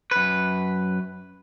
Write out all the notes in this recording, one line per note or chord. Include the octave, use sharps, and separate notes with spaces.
F#2 B4